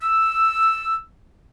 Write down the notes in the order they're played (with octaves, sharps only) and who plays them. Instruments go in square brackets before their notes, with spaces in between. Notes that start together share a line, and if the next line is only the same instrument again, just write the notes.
[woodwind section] E6